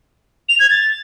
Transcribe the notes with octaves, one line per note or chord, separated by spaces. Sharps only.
F7
G#6
A6